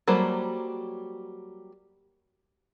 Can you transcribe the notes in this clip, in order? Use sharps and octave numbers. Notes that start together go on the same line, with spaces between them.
F#3 G3 A#3 A4 C5